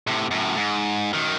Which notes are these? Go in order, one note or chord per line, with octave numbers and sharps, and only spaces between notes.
A2 C3
F#2 A2
G#2
F#2 D#3